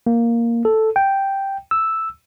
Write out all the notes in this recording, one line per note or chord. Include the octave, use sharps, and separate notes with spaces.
A#3
A4
G5
E6